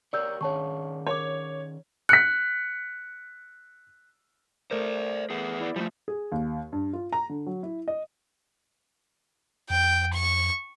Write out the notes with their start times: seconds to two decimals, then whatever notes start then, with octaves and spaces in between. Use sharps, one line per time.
0.13 G4 A#4 C#5 D5 E6 G6
0.41 D#3 C#4 G#4 C#5 A5 C#6
1.06 A#4 C#5 D6
2.09 F#6 B6 C#7
4.71 A3 A#4 C5 D5
5.30 B3 G#4
5.61 E4 D5
5.76 F3 G3 A3
6.08 G#4
6.32 D#2
6.72 G2
6.93 F4
7.13 A#5
7.29 D3
7.46 F#3
7.63 E4
7.88 D#5
9.70 F2 G5
10.13 C#6